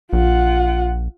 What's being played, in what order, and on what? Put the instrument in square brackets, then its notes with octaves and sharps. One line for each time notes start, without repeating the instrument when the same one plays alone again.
[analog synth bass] A#1 [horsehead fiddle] F4 F#5